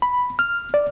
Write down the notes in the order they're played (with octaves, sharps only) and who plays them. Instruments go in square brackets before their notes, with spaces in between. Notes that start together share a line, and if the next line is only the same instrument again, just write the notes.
[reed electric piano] B5
F6
D5